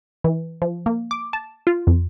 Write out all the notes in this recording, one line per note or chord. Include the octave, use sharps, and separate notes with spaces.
E3
F3
A#3
D6
A5
F4
F2